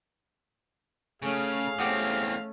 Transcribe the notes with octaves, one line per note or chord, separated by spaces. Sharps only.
C#3 A3 C#4 G#4 F5
E2 A3 C4 C#4 G4 F#5 D#6